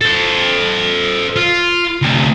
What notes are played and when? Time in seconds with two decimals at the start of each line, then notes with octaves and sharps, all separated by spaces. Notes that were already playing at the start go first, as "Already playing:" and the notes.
0.01 A4 C5
1.36 F4
2.02 D2 C3